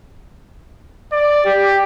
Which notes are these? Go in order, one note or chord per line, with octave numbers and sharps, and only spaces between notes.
D5
G4